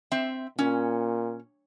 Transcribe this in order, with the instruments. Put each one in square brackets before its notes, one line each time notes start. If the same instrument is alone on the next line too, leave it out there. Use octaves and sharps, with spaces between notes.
[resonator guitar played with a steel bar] C4 E5
[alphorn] A#2 [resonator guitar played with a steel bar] C#4